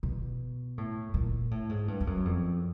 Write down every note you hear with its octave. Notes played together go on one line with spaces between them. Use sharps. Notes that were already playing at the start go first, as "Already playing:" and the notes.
B2
A2
A#2
A2
G#2
G2
G2
F#2
F2